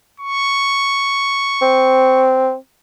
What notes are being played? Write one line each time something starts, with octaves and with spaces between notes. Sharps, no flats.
C#6
C4